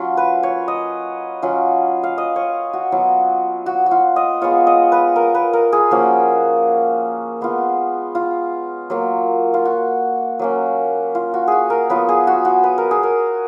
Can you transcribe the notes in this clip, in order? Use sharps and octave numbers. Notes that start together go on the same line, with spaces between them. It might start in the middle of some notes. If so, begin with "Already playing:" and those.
Already playing: F#3 C#4 F4
B4
C#5
D#5
F#3 C#4 F4
F5
D#5
C#5
F#4
F#3 B3 F4
F#4
F#4
F4
D#5
G#3 B3 F4 C#5
D#5
B4
A#4
B4
A#4
G#4
F3 A#3 C#4 F#4
G#3 B3 F4
F4
F#3 A#3 F4
F4
F#4
F#3 A#3 C#4
F4
F#4
F#4 G#4
A#4
F#3 B3 F4 B4
G#4
F#4
F#4
B4
A#4
G#4
A#4